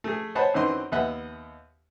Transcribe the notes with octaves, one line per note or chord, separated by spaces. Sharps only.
A3 G#4
C5 C#5 D#5 F#5 A5 B5
F#2 D#3 E3 C4 D#5 C6
D#2 B3 D#5 E5 F#5